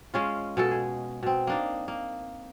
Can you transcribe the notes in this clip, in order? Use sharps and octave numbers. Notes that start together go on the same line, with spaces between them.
G#3 C#4 F4
B2 G#3 A4
G#4
B2 C4
A#3 D4 D#4
A#3